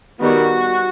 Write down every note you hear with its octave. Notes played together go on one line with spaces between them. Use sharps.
D#3 G3 B3 F#4